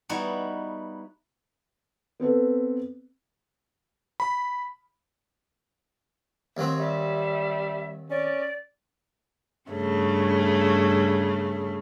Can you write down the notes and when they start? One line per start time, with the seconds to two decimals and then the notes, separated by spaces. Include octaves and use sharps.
0.09 G3 B3 D#4 E4 F#4
2.20 B3 C4 A4 B4
4.20 B5
6.57 D#2 F#3 C4
6.78 G3 E5
8.10 C#4 D5
9.70 G2 C#3 A3